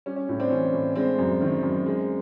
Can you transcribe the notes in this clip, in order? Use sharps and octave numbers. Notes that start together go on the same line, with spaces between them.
G3 C#4
C#4
A2
C4 D4
E3 C#4
A2
G#3 C4 D4
F#2
D#3
F#2
G#3